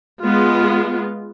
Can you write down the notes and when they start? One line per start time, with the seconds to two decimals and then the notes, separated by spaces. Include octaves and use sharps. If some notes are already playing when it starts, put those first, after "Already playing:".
0.23 G#3 B3 F4